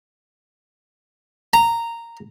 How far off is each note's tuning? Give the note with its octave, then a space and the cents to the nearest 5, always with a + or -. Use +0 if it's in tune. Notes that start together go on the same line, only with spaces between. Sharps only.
A#5 -10